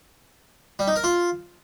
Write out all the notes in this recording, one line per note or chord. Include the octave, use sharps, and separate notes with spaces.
G3
D#4
A#4
F4